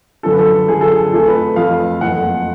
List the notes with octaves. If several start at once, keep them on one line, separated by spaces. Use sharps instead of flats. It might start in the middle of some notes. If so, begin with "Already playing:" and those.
F#2 D3 F3 A4
B4
A4
F#2 D3 F3 G#4
A4
G#4
F2 F3 A3 A4
B4
F2 F3 A3 F5
F#1 F2 F3 A3 F#5